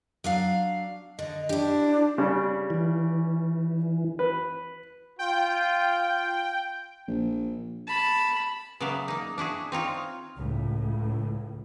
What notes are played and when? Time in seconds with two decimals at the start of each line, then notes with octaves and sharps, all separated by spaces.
0.24 F#3 D4 F5
1.19 D3 D#5
1.49 D4 E4 G4
2.18 C#3 G3 D4
2.70 E3
4.19 B4
5.19 F4 G5
7.08 A#1
7.87 A5 B5
8.80 C#3 F#3 B3 D5 E5 F5
9.08 A#3 D#4
9.38 D4 E4 F#4 G#4
9.72 C4 D#4 F4 C#5
10.37 C#2 A2